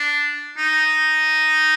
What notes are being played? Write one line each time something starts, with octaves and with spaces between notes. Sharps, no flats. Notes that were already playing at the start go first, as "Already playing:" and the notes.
Already playing: D4
D#4